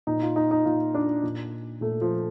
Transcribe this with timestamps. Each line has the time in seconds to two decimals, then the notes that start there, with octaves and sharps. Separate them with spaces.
0.07 A#2 D#4
0.22 F4
0.36 D#4
0.51 D#4
0.65 A#2 F4
0.95 D4
1.23 A#2
1.81 A#2 A3
2.01 F3